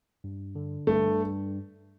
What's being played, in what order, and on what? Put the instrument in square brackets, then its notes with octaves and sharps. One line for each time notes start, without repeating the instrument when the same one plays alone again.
[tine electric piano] G2
D3
[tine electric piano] G2 [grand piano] A3